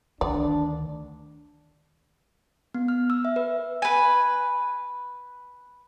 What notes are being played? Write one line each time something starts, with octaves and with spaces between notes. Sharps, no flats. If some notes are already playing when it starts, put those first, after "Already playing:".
D2 D#3 D4 D5
B3
F6
E6
E5
B4
B4 G#5